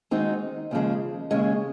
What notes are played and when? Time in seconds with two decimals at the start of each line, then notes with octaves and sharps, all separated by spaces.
0.11 D#3 G#3 C4 D#4 F#4
0.71 D#2 C#3 F3 G#3
1.31 D#2 C#3 G#3 C#4